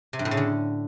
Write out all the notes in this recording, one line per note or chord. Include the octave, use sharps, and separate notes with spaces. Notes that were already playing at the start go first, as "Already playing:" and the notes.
C3
G2
A2
C#3
D3